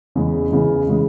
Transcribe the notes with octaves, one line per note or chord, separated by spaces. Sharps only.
E2 C#3 E3 G#3
E2 C#3 E3 G#3
C#3 E3 G#3